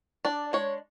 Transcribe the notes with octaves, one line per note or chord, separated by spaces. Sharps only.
D4 D5
G#3 C#5